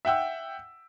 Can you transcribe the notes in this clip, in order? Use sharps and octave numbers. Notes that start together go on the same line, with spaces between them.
E5 F#5 G5 E6